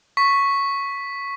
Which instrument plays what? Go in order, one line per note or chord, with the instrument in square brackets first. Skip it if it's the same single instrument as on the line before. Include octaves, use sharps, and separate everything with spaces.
[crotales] C#6 B6